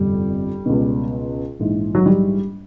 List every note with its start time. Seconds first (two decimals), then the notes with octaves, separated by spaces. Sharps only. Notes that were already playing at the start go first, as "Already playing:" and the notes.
Already playing: G1 F2 C3 G3
0.66 C#2 B2
1.59 A#1 G#2 E3
1.95 F#3
2.06 G3